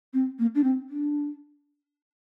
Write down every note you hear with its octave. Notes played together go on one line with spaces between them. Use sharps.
C4
A#3
D4
C4
D4